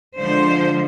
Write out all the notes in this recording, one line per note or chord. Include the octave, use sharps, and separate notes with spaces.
D3 F3 G#3 C5